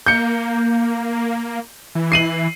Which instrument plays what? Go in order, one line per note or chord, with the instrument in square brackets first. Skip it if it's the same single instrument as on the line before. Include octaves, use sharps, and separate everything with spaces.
[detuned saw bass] A#3 [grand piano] G6 C#7
[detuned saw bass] E3
[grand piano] C7 D#7 F#7